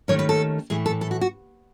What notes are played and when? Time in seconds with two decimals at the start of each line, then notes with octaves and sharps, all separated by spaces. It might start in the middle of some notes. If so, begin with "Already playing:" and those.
0.08 D#2 D#3 A3 C#4 C#5
0.19 B4
0.29 A4
0.70 A2 E3 A3 G#4
0.86 A4
1.01 A4
1.11 F#4
1.21 F#4